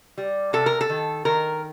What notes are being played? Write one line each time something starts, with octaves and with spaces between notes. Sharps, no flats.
G3
C3 A4
A#4
A4
D#3
D#3 A#4